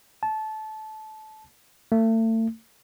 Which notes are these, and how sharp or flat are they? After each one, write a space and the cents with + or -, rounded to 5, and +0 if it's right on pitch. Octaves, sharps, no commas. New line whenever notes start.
A5 -20
A3 +35